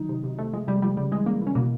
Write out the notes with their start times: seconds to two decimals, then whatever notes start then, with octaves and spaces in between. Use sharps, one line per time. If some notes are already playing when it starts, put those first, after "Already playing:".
Already playing: D#3 F#3 D#4
0.09 C3
0.24 C3
0.38 C3 A3
0.53 F3 G#3
0.67 C3 G3
0.82 F3 G3
0.97 C#3 G3
1.11 E3 G#3
1.26 C#3 A#3
1.42 E3 C#4
1.55 B2 A#3